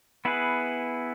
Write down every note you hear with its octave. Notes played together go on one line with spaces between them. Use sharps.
B3 E4 G#4 B4